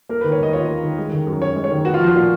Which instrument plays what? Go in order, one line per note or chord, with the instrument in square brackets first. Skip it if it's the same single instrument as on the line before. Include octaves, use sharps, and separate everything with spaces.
[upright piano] A#3 [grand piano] A#4
[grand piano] B4
[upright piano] D#3
[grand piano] C#5
[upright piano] D#2 [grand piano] D#5
[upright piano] F4 [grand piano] C#5
[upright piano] A#3
D#3
G#3
D#3
F#2
[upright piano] C#4 [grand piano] C#5
[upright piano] G#3
[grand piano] C#5
[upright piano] D#3
[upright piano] B3 [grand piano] F#4
[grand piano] F4
[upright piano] F3 [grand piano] F#4
[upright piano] A#2